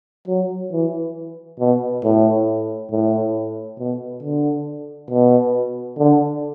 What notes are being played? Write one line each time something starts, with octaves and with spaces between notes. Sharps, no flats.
F#3
E3
B2
A2
A2
B2
D3
B2
D3